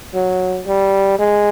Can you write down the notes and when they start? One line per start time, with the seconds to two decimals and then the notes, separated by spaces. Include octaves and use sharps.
0.14 F#3
0.67 G3
1.19 G#3